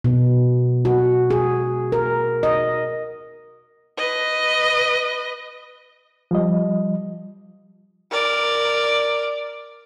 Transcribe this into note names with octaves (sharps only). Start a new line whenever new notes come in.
B2
F#4
G#4
A#4
D#5
B4 D#5
F3 G3 D#5
A#4 D5